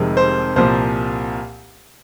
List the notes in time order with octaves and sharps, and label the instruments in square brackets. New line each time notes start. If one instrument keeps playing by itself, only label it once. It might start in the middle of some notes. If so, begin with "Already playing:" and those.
Already playing: [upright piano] F1 F2 C3 D#3 G#3
C5
C2 A#2 F3 C5